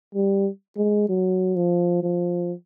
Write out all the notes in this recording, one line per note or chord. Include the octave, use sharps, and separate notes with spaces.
G3
G#3
F#3
F3
F3